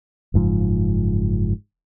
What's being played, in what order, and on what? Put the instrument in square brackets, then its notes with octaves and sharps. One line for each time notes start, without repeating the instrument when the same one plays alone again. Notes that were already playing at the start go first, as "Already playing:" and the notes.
[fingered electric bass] F#1 G#2 F3